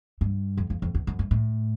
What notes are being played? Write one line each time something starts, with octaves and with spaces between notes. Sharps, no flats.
G2
F2
F2
F2
E2
F#2
G2
A2